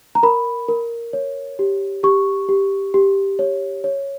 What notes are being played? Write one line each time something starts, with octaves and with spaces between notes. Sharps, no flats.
A#5
A#4 B5
A#4
C#5
G4
G4 C#6
G4
G4
C#5
C#5